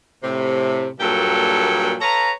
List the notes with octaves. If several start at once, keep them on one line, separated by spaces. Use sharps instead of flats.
A2 C3
G2 A#2 F#3 A#3 A4 G5
A4 B4 C#5 F5 A#5